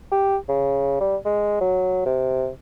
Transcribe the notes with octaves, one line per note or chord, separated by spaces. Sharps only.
G4
C#3
G3
G#3
F#3
C3